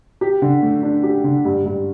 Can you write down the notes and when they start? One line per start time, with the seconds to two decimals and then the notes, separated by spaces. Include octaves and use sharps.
0.21 G4
0.42 D3
0.62 A3
0.83 D4
1.03 G4
1.24 D3
1.45 G2
1.66 G2